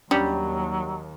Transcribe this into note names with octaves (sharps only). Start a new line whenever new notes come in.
D#2 F#3 G3 C#4 D4 C#7